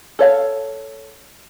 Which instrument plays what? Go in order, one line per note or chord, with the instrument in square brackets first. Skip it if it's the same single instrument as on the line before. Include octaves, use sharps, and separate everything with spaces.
[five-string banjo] A4 C#5 F5